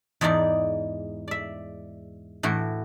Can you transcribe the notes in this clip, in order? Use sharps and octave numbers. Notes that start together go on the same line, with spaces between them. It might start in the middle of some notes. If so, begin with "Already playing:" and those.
E2 G#2 E3 D#4 D5
D5 E5
A2 E3 F#4